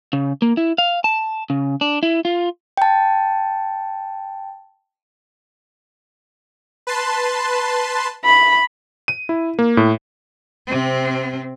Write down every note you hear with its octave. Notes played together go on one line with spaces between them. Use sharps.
C#3
A#3
E4
F5
A5
C#3
D4
E4
F4
G5 A5
B4 A5 C6
B5
D#7
E4
A#3
A2
C3 C4